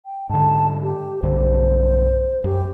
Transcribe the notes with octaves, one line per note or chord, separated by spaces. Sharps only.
G5
G#2 D3 A5
G4
B1 G2 D3 C5
F#2 G4